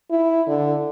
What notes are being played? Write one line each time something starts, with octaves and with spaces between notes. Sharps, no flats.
E4
D3